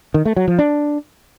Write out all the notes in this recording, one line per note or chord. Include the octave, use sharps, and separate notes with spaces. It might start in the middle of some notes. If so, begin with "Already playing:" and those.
D#3
A3
F#3
F3
D4